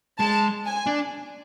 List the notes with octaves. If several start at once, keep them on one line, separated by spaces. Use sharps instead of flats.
G#3 A5
G#5
D4